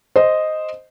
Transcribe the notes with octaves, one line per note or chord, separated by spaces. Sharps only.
C5 D#5